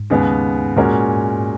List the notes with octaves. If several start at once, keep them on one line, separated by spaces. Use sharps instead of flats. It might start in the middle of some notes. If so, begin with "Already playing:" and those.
Already playing: G#2
D#2 C#3 G#3 B3
A#2 G#3 C#4 F#4 A#4